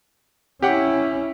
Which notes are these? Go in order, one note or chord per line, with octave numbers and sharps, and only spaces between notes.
C#4 E4 G4 F#5 D6